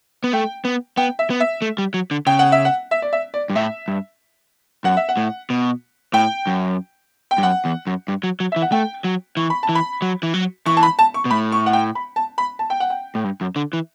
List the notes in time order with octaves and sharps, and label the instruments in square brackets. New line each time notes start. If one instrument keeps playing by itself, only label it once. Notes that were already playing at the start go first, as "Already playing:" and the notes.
[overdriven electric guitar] B3
[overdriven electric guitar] A3 [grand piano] G5
[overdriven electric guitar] B3
[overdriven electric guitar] B3 [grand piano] G5
[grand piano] E5
[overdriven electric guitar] B3
[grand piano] E5
[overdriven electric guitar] A3
G3
F#3
D3
[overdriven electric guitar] C#3 [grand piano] G5
[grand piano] F#5
E5
F#5
E5
D5
E5
D5
[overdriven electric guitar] G2
[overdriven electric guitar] A2 [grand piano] E5
[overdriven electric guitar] G2
[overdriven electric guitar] F#2 [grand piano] F#5
[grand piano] E5
F#5
[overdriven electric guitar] A2
B2
[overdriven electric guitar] A2 [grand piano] G5
[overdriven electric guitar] F#2
[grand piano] G5
[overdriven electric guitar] G2
[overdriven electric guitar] F#2 [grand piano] F#5
[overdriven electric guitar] E2
F#2
G2
F#3
F#3
[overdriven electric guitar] E3 [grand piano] E5
[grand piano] F#5
[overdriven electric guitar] A3 [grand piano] G5
[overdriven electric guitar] F#3
[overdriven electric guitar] E3 [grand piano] C#6
[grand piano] B5
A5
[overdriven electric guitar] E3
[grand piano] B5
[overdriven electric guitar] F#3
E3
F#3
[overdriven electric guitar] E3 [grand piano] C#6
[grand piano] A5
B5
A5
C#6
[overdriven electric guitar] B2
[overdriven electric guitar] A2 [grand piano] B5
[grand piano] C#6
F#5
G5
B5
A5
B5
A5
G5
F#5
G5
[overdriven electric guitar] A2
G2
F#2
D3
E3